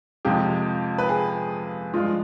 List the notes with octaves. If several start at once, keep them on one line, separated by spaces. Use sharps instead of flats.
F2 C3 F3 G#3 G4
B4
G#4
G2 F3 G#3 F4